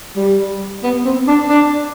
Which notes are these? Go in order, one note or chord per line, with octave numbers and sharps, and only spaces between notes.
G3
B3
C4
D4
D4